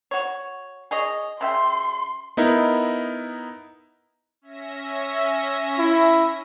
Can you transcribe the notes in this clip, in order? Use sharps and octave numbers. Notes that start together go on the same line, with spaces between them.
F#4 C#5
G#4 C#5 D#5
C#3 E5 G5 C6
B3 D#4 E4 A#4
C#4 E5 A#6
E4